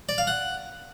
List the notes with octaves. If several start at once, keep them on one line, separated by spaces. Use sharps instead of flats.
D5
F5
F#5